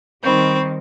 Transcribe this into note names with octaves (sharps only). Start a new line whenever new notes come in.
D#3 G3 C4 B5 C#6 G6